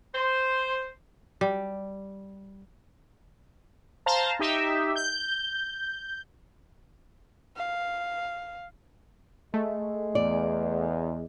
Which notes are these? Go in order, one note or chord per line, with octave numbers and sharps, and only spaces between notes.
C5
G3
C5 F5 A5 A#5
D#4 G4 E5
G6
F5
G#3 A3
E2 D5